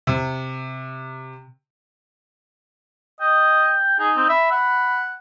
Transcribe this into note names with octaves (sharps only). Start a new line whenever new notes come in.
C3
D#5 G5
D#4 G#4
C4
E5 B5
F#5